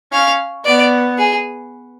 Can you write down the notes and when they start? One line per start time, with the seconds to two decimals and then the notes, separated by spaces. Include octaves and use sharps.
0.12 C#4 F5
0.65 B3 D5
1.18 G#4